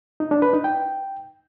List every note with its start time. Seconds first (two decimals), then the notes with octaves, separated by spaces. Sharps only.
0.20 D#4
0.31 D4
0.42 B4
0.53 D#4
0.64 G5